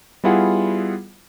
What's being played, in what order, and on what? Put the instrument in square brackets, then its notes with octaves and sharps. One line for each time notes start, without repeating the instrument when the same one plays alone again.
[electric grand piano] G3 B3 E4 F4 G#4 F#5